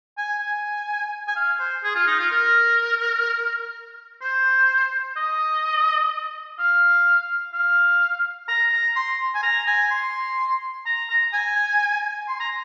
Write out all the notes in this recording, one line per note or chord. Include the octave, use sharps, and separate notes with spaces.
G#5
G#5
G#5
F5
C5
G#4
F4
D#4
F4
A#4
C5
D#5
F5
F5
A#5
A#5
C6
G#5
A#5
G#5
C6
A#5
A#5
G#5
C6
A#5